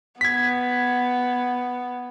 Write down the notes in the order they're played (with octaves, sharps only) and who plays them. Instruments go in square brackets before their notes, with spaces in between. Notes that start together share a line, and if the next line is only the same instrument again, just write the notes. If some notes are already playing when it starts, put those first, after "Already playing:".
[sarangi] B3 [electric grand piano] G#6 B6